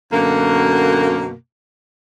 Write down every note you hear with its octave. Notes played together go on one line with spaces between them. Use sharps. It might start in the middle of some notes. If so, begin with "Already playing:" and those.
F#2 B2 D3 A#3